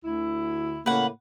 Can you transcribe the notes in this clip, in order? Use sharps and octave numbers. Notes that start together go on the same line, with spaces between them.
D2 E4
A2 C#3 A#3 B4 F#5